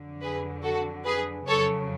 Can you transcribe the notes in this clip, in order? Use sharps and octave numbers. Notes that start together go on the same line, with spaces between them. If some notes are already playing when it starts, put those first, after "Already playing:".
Already playing: F2 D3 F#3
G#4 B4
F#4 A4
G#4 B4
F2 C#3 F#3 A4 C#5